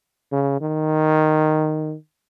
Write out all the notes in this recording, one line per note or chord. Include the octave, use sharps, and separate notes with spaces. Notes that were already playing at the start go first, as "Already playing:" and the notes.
C#3
D#3